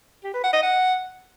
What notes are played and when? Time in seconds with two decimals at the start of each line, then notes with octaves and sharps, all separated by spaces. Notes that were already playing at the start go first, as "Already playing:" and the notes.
0.24 G4
0.34 B4
0.44 F#5
0.53 D#5
0.63 F#5